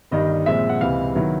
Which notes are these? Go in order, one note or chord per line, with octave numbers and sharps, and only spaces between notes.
G1 G2 D#3 G3 D#5
A#2 F3 G#3 C4 E5
F#5
C#2 C3 E3 F5
D#3 F#3 B3 E4